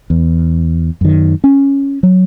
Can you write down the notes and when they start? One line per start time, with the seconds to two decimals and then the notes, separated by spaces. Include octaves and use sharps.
0.10 E2
1.01 F#2 D#3
1.44 C#4
2.03 F#3